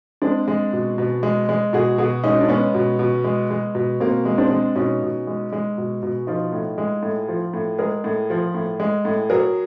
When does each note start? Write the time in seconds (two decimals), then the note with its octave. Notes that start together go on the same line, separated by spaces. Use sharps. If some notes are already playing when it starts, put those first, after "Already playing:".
0.22 G#3 C4 D4
0.48 G#3
0.73 B2
0.98 B2
1.23 G#3
1.49 G#3
1.73 B2 F#4 G#4
1.98 B2 F#4 G#4
2.24 G#3 C#4 D#4
2.40 D4
2.49 G#3 B3 C#4
2.74 B2
2.99 B2
3.24 G#3
3.50 G#3
3.75 B2
4.00 B2 A#3 C4
4.25 G#3
4.38 C4 D4
4.50 G#3
4.76 B2 C#4 D#4
5.02 B2
5.27 G#3
5.52 G#3
5.78 B2
6.03 B2
6.27 F3 D#4 F4
6.53 A2
6.78 G#3
7.03 A2
7.28 F3
7.54 A2
7.78 G#3 G#4 A#4
8.04 A2
8.30 F3
8.54 A2
8.80 G#3
9.05 A2
9.30 F#3 G#4 A#4